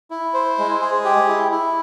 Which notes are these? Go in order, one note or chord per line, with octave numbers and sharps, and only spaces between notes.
E4
C5
G#3
G#4
G4
E4
E4